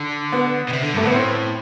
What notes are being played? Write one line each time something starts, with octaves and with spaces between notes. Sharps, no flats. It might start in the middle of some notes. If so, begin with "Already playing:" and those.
Already playing: D3
B3
B2
C3
D3
G2 A3
A2 B3
C4